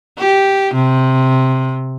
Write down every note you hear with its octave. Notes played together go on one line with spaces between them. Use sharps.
G4
C3